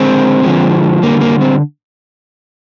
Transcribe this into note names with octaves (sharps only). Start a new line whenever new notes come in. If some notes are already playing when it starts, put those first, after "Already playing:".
Already playing: D3 G#3 C4
D3 F3 G#3
D3 G3 A#3
A#3
C4